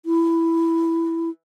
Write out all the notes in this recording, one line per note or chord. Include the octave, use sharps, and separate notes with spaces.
E4